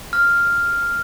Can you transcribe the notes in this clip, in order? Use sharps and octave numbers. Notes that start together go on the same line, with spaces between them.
F6